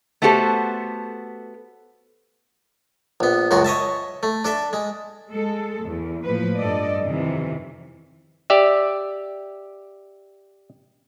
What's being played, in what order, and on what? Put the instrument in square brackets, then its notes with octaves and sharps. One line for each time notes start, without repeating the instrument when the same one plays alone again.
[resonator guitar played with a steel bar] A3 B3 F#4 G4 A4 C5
[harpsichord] A#1 B3
C#2 F#2 G#3 F#4 C6
C#5 D#5 E5 A5
A3
D4 A4 E5
G#3
[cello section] G#3 A4
E2
A2 F3 A#3 B4
G2 A4 D5 D#5
F2 C3 D#3 E3
[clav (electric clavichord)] G4 D5 E5